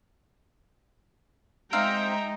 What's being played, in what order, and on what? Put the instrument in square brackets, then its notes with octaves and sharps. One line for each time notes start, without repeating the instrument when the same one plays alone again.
[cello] G#3 D#4 [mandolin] C4 F5 [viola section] E5 G5 A#5